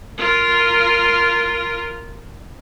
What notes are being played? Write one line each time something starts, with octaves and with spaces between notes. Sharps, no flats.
F4 A#4